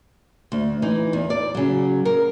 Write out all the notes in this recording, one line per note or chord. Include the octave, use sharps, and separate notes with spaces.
D2
E3 D#4
E2
D5
C#3 F#3
A#4